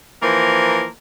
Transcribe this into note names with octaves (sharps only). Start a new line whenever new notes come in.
E3 F3 A#3 A#4